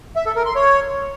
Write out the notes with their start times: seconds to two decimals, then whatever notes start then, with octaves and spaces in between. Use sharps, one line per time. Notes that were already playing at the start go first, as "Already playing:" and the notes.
0.16 E5
0.26 A4
0.36 A#4
0.46 C6
0.55 C#5